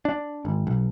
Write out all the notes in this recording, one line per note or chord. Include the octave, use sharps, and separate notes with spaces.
D4
G#1
B1